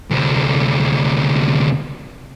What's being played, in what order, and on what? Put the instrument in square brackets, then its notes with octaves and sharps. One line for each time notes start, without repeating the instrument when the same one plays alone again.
[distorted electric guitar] D2 C3